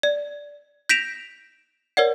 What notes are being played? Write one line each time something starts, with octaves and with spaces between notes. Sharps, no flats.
D5
G6 A#6 B6 D7 E7 F7
A#4 C#5 D5 F#5